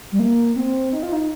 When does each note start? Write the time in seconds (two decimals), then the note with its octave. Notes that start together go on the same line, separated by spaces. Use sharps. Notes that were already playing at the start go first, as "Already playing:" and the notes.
0.12 G3
0.19 A#3
0.56 C4
0.93 D#4
1.03 F4
1.13 D#4